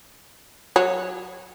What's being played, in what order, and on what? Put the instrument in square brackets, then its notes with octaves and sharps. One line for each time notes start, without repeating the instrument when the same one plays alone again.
[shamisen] F#3 C#5